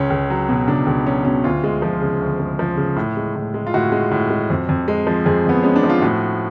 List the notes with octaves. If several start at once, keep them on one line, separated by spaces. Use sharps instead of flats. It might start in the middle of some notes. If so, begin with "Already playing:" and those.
Already playing: C#2 C#4
C#2
F#3
B2
C#2 D4
C#2
F#3 C#4
B2 C#4
D2 F4
G#3
F3
C#3
D2
G#3
F3
C#3
A2
G#3
A2
G#3
F4
A2 F#4
G#3
A2
G#3
F2
F2
G#3
F3
F2 G#4
F2 B3
G#3 C#4
D4
F3
F4
A2 F#4